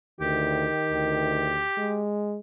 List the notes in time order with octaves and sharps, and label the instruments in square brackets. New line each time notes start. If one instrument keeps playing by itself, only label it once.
[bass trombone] D2 [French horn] D#3 [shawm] G4
[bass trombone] D2
G#3